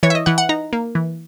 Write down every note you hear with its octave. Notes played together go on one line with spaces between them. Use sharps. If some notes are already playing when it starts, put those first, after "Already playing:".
E3 C#5
E5
D#5
E3 F#5
F#5
D#4 A#5
A#3
E3